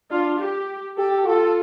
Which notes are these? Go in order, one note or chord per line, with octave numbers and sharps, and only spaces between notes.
D4 F4
G4
G4 A4
F4 A4